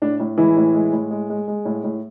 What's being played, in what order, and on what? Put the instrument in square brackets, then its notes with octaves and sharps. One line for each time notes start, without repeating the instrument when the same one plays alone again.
[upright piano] A2 D4
A2
E3 G#3 E4
A2
G#3
A2
G#3
G#3
G#3
A2
A2